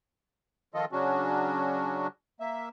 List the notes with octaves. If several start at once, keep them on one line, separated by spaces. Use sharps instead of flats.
D#3 F3 F4 A4 D#5
C#3 F#3 C#4 D4 F#4
A#3 E5